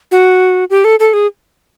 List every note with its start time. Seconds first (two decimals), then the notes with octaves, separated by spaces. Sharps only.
0.11 F#4
0.70 G4
0.84 A4
1.00 A4
1.13 G#4